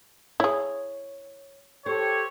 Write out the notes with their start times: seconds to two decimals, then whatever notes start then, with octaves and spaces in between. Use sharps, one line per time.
0.40 E4 G#4 C#5
1.86 G4 A4 C5 C#5